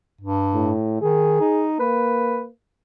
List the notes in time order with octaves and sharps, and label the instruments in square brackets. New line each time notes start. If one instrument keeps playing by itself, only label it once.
[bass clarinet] G2
[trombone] A2
[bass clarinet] D#3 [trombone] G#4
[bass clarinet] D#4
[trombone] A#3 [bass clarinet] B4